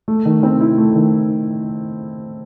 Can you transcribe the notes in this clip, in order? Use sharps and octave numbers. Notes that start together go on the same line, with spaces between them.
A3
D#3
C4
E4
A3
D#3